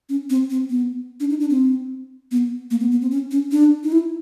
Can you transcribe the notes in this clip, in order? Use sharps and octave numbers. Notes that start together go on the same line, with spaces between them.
C#4
C4
C4
B3
D4
D#4
D4
C4
B3
A#3
B3
B3
C4
C#4
C#4
D4
D#4
E4